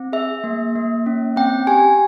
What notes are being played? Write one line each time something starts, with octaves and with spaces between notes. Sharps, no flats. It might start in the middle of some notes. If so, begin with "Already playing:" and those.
Already playing: C4
G#4 E5
A#3
A#3
C#4
C4 G5
G4 G#5